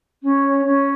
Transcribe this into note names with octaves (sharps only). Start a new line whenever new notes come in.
C#4
C#5
C#4